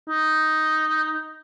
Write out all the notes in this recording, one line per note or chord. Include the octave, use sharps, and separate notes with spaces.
D#4